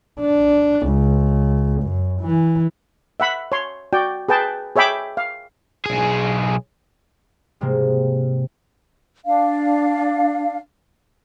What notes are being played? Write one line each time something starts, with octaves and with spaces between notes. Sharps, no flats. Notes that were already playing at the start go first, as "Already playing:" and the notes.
D4
C#2
F#2
E3
E5 F#5 B5
C#5 C6
F#4 D5 G5
G#4 B4 G5 A5
G#4 C#5 E5 G5 B5 D6
F5
B1 G#4
G#2 C3 G3 G#3 A#3
D4 F5